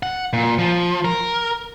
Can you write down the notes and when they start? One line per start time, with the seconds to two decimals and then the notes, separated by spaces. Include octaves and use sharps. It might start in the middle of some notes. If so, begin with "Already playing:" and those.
0.03 F#5
0.33 A#2
0.59 F3
1.05 A#4